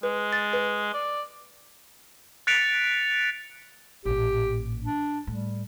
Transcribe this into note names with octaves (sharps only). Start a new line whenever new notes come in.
G#3 B4
A6
B4
D5
F#6 A6 B6 C#7 D7 F7
A1 A#2 G4
D4
A2 G3